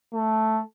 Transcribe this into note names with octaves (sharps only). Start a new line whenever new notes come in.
A3